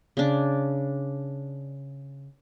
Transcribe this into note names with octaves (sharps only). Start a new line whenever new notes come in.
C#3 D4